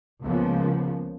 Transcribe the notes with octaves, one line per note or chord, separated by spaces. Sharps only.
C#2 C#3 F3 A#3 B3